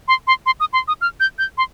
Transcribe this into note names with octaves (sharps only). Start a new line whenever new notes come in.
C6
C6
C6
D#6
C6
D#6
F6
G6
G6
C6